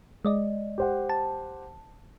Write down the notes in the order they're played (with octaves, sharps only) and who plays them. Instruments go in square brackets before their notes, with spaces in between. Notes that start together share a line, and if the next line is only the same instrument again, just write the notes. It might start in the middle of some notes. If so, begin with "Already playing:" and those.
[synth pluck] G#3 D5 D#5
[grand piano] G4 C5 F#5
[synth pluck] A5